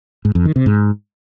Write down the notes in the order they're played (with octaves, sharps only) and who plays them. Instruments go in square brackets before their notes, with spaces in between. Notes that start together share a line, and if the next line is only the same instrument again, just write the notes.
[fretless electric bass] G#2
F2
D#3
C3
G#2